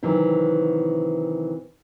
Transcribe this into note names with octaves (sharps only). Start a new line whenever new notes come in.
C3 D#3 E3 F#3